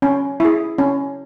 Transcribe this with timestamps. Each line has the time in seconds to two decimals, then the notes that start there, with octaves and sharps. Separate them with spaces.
0.02 C#4
0.40 E4 G#4
0.78 C#4